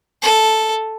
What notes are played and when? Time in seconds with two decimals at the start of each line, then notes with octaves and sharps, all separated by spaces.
0.22 A4